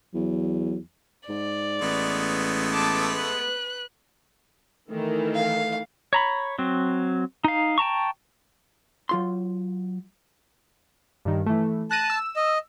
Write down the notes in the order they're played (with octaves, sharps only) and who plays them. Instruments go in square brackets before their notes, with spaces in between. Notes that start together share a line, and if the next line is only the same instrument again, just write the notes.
[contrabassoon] E2 [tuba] F#3
[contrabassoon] G#2 [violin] D5
[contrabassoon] A1 [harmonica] G#3 A3 B3
[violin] A5 D6
B4 F#6
[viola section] D#3 E3 [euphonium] A3
[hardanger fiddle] F5
[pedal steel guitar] C#5 A#5 B5
F#3 C4
D#4 F5
G5 A5 A#5 C#6
[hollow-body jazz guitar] F#3 F4 C6
[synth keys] G2 D#3
E3 A3
[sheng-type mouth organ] A5 [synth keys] F#6 A#6 D#7
[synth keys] E6
[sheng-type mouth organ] D#5